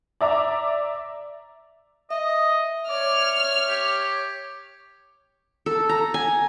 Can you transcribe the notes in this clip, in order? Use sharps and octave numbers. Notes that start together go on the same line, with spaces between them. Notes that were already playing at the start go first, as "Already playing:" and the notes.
D5 E5 A#5 D6
D#5 E5
C#5 D5 F6
G4
A4
A#5
G#5